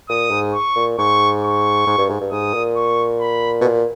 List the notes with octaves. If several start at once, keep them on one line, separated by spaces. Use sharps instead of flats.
A#2 D#6
G#2
C#6
A#2
G#2 C#6
C#6
G#2
G2
G#2
G2
G#2 D#6
A#2
C#6
B5
B2
A#2